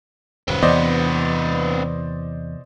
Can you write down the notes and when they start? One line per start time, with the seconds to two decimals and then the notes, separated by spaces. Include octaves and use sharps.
0.48 D#1 F#2 C#3 C4 B4
0.63 E2 C3 E3 B3 C5 D5 D#5